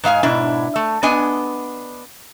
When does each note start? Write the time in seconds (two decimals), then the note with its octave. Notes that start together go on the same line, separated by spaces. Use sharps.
0.04 G#2 G#3 F5 G#5
0.23 G#2 B2 D4 E4
0.76 A3
1.03 B3 D4 D#5 G#5